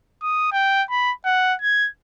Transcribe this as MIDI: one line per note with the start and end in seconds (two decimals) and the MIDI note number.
0.22 0.47 87
0.52 0.83 79
0.90 1.12 83
1.25 1.54 78
1.62 1.89 92